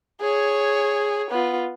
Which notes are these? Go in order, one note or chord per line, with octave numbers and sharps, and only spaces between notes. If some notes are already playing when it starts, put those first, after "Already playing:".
G#4 C#5
B3 F4